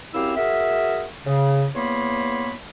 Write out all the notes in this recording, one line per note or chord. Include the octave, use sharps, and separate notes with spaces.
F#2 C4 E4 G4 F5 E6
F#4 G#4 A#4 E5
C#3
E2 A#3 B3 C#5 B5 C6